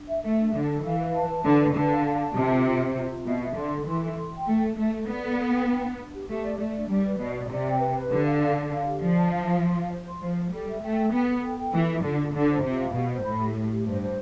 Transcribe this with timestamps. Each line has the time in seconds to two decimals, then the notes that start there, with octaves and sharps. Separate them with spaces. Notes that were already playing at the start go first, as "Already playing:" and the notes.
Already playing: D4
0.08 E5
0.23 A3 E5
0.39 D4
0.53 D3 D4
0.69 A4
0.84 E3 F5
0.99 B4
1.15 A5
1.29 B4
1.44 D3 B4
1.60 B4
1.75 D3 A5
1.90 F5
2.05 A5
2.20 A5
2.35 C3 F4
2.50 C5
2.65 F4
2.81 C5
2.96 F4
3.10 F4
3.26 B2 E5
3.42 E5
3.56 D3 C6
3.72 A4
3.87 E3 C6
4.01 A4
4.17 C6
4.32 G5
4.47 A3 A4
4.62 A4
4.77 A3 A4
4.93 A4
5.08 B3 D5
5.23 A4
5.38 A4
5.53 G5
5.68 D4
5.83 D4
5.98 D4
6.14 G4
6.29 A3 G4
6.44 D5
6.59 A3 D5
6.74 D4
6.89 G3 D5
7.04 B4
7.19 B2 D5
7.35 D5
7.49 C3 D5
7.65 G5
7.80 B4
7.95 B4
8.11 D3 G4
8.26 F5
8.40 D5
8.56 D5
8.70 F5
8.86 G4
9.01 F3 D5
9.17 A5
9.31 F5
9.47 F5
9.62 C6
9.76 F5
9.92 C5
10.07 C6
10.21 F3 C5
10.37 C5
10.52 G3 A4
10.67 E5
10.82 A3 G5
10.97 A4
11.13 B3 A4
11.28 A4
11.43 G5
11.59 A4
11.74 E3 F4
11.89 F4
12.03 D3 F4
12.19 F4
12.34 D3 F4
12.48 C5
12.63 C3 F4
12.79 F5
12.94 B2 G4
13.10 C5
13.24 A2 B5
13.40 G4
13.54 G4
13.71 G4
13.85 G2 C5
14.00 C5